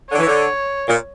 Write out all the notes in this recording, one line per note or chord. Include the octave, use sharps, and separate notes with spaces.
D3 C#5
E3
D3
A#2